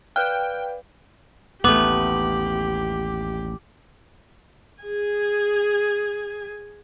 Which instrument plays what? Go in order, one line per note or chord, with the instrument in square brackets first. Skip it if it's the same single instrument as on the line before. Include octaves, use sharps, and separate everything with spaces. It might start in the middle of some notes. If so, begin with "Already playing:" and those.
[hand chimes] B4 D5 F5 [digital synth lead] G5 [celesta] F6 F#6
[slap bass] A1 D#2 [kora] A3 B3 [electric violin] G4 [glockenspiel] D6 F#7
[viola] G#4 G#5